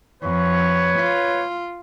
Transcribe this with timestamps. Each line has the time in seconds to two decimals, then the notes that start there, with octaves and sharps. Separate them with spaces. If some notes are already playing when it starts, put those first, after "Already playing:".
0.23 F2 B4 C#5
0.99 F4